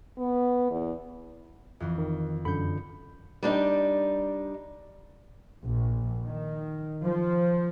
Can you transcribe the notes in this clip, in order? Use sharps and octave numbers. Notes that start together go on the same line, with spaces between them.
B3
E2
F2 E3
D#3
F#2 D3 B5 G6 C#7
G3 D4 D#4
A#1
D#3
F3